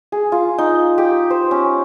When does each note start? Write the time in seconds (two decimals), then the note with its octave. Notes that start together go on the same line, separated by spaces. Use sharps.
0.12 G#4
0.32 F4
0.58 D#4
0.98 G4
1.30 C5
1.51 C#4